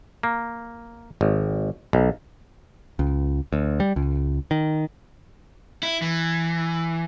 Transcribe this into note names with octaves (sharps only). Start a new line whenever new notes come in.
A#3
G#1
B1
C#2
D2
G3
C#2
D#3
E4
E3